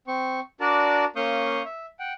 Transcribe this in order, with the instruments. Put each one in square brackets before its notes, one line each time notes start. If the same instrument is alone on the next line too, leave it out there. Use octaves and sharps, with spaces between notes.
[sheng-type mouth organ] C4 C#6
D4 F#4 A#4 D5 A5
A#3 C#4 F5 C#6 D#6 G6
E5
F#5 G5